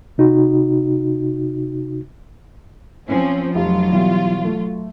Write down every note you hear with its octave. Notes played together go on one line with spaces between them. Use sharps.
C3 D#4 F#4
F3 C4 C#4
F1 F#3 F4
B2 E3 G3
A3